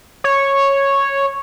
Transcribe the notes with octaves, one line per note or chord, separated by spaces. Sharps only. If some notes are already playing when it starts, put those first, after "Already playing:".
C#5